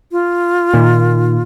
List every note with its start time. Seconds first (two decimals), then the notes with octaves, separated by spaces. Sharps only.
0.12 F4
0.74 A#2 D#3